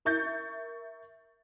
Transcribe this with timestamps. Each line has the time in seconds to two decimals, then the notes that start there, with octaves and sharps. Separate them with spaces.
0.05 A#4 E5 C#6 G6 A6